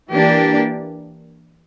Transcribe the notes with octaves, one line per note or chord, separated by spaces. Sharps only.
E3 A#3 D4 G4